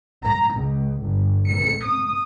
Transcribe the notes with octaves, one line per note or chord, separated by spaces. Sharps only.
A#5
C#2
G1
C#7
D#6